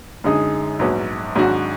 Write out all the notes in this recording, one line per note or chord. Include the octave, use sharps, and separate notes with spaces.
F#2 D3 G#3 D#4 G#4
A#1 G#2 F#3 B3
G#1 G#2 F#3 D4 F#4